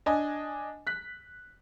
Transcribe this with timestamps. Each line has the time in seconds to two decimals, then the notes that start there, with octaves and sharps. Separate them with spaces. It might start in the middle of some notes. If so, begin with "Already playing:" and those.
0.06 D4 D#5 G#5
0.87 F#6 B6